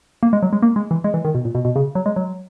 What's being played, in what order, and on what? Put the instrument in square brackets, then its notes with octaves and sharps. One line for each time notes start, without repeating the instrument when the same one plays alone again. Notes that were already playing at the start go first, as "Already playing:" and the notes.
[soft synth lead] A#3
G#3
F#3
G#3
A#3
G#3
E3
G#3
E3
D#3
B2
A#2
B2
B2
C#3
F#3
G#3
F#3